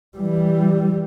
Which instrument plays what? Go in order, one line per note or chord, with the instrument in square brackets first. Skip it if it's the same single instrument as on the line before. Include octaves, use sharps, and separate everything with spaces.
[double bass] E3 G3